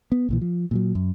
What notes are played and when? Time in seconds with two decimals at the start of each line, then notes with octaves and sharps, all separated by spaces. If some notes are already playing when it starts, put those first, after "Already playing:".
0.12 B3
0.29 B1 A#2 E3
0.41 F3
0.71 A#2 F3 F#3
0.95 F#2